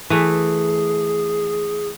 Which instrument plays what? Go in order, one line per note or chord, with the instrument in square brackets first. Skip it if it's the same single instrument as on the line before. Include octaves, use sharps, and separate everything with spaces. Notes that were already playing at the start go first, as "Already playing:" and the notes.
[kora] E3 A3 [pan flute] G#4